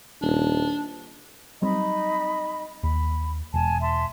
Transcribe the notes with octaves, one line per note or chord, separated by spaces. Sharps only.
D#1 D4
F#3 G3 C4 D#4 D#5 B5
D#2 B5
E1 G#5 A5
E5 A5 C6